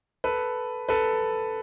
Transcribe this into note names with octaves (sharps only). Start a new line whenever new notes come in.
A4 B4
A4 B4